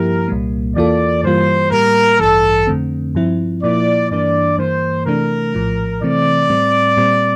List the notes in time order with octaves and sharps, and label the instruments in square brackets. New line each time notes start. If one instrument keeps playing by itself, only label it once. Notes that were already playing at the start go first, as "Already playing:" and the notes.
Already playing: [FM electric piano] G2 F3 A#3 E4 G4 [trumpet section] A#4
[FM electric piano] C2 A#2 G3 A#3
[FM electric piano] E2 E3 A#3 F4 A4 [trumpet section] D5
[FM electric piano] G2 E3 G3 A#3 F4 [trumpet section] C5
[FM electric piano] A2 G3 A#3 [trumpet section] A#4
[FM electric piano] A1 G2 E3 [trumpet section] A4
[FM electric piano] F2 D3 A3 C4
G2 F3 C4 E4
[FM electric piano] A#2 F3 A#3 E4 [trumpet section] D5
[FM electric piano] G2 E3 A#3 D4 [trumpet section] D5
[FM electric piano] G2 E3 A#3 [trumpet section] C5
[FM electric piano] C3 E3 A3 D4 [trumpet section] A#4
[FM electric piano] A#1 A2 F3
[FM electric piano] C3 E3 A3 C4 [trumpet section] D5
[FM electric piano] A2 G3 C4
A#2 G3 C4